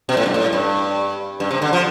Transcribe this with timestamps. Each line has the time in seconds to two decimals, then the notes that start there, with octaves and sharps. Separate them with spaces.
0.09 B2
0.17 A2
0.26 G2
0.34 A2
0.53 G2
1.40 G2
1.51 C3
1.62 D3
1.73 F3